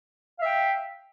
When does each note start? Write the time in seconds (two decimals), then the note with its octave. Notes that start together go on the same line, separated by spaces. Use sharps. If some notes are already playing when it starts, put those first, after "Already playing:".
0.36 F5
0.41 E5
0.45 G5